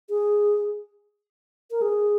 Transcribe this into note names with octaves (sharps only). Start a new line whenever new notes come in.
G#4
A#4
G#4